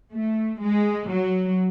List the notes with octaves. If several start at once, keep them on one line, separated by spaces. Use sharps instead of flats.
A3
G#3
F#3